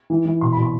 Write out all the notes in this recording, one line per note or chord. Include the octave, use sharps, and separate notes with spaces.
E3
E3
B2 C6
B5
B2
C6